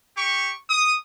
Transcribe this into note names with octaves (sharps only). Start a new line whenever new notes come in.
G4 C#6
D#6